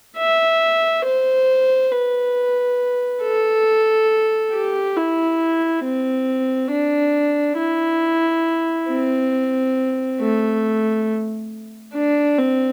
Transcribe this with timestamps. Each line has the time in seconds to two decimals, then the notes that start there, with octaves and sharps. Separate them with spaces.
0.17 E5
1.05 C5
1.92 B4
3.22 A4
4.53 G4
4.96 E4
5.84 C4
6.71 D4
7.58 E4
8.89 C4
10.20 A3
11.94 D4
12.38 C4